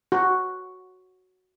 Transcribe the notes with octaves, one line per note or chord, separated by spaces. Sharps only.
F#4